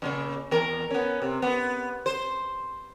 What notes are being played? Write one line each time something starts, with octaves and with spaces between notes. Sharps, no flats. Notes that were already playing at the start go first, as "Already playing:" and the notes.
G2 A#2 C#3
E2 A#4
B3 C#4
C3
B3
C5